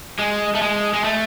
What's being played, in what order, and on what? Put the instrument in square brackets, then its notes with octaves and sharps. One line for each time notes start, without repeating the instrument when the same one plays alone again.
[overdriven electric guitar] G#3
A3
G#3
G#3
A3